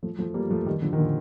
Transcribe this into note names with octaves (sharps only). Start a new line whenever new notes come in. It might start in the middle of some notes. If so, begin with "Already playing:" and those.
F3 A3
F3 A3
G3 A#3
F3 A3
D#3 G3
D3 F3
D#3
A#2 D3